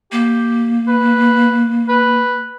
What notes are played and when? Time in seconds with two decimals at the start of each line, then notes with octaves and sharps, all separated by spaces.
0.12 A#3 G4
0.88 B4
1.89 B4